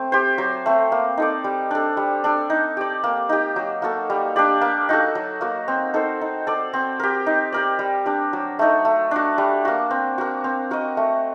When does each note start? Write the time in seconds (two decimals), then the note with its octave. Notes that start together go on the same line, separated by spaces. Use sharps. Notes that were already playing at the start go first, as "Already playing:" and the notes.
Already playing: A3 C4
0.12 G4 C5
0.38 F#3
0.66 A3 C4
0.92 A#3
1.17 D#4 A4 D5
1.44 G3
1.71 D4 A4
1.97 G3
2.24 D4 A4
2.50 D#4
2.77 G4 D5
3.04 A#3
3.29 D#4 G4
3.56 F#3
3.82 A#3 F#4 A4
4.10 G3
4.36 D4 G4 D5
4.61 A#3
4.89 D#4 F#4 A4
5.15 F#3
5.41 A#3 F#4
5.68 C4
5.94 D#4 A4 C5
6.21 D#4
6.47 A4 D5
6.73 C4
7.00 G4 A#4
7.26 D#4
7.52 G4 A#4 D5
7.79 G3
8.06 D4 G4
8.33 F#3
8.59 A3 D#4 A4
8.85 A3
9.11 D4 F#4
9.38 G3
9.65 A#3 F#4
9.91 C4
10.18 F#4 A#4
10.44 C4
10.71 F#4 A#4 D#5
10.97 A3